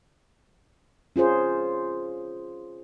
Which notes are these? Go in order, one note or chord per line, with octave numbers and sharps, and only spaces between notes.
C#4 F4 G#4 C5